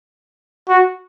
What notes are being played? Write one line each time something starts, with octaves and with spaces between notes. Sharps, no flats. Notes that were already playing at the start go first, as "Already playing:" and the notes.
F#4